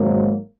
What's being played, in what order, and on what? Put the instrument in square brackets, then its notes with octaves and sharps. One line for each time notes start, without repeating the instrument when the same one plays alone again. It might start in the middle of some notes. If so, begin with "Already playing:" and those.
Already playing: [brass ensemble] G#1 G#2 F#3 A#3